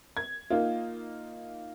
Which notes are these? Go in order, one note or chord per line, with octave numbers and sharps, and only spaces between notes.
G#6
A#3 D#4 F4